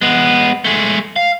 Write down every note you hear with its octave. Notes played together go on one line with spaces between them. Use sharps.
G#3 B3
G#3 A3
F5